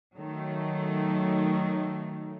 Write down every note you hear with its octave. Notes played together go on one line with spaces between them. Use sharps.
D#3 F#3 A3